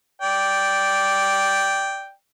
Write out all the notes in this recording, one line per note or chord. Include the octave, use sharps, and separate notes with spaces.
D5 G5